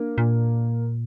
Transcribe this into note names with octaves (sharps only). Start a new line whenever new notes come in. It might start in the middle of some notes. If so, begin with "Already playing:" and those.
Already playing: A#3 D4
A#2